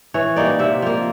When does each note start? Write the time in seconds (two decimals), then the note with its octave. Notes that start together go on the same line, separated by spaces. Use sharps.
0.14 E3 C#5
0.36 G3 A#3 D#4 D5
0.59 C3 E5
0.82 F3 A#3